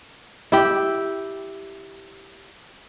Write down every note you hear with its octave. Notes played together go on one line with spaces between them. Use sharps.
E4 G4